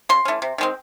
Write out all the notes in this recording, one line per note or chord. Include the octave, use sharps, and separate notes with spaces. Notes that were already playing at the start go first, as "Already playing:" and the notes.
C#3 C6
E3 A3 C#4
C3
D#3 G#3 C4